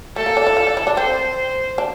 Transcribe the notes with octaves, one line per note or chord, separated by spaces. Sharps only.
A3 A4
A#3
D4
E4
F4
D4
E4
D4
C4 C5
D4